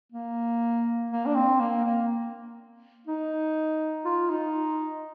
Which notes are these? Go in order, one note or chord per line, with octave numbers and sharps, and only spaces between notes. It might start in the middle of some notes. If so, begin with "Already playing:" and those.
A#3
A#3
D4
C4
A#3
A#3
D#4
F4
D#4